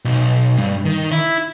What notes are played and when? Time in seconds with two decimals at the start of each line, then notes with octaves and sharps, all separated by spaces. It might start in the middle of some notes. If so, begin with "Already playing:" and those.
0.05 B1
0.58 G2
0.85 D#3
1.11 E4